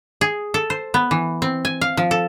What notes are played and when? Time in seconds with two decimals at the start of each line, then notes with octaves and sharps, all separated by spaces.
0.21 G#4
0.54 A4
0.70 C5
0.94 B3
1.11 E3
1.42 C4
1.65 G#5
1.81 F5
1.97 F3
2.11 A4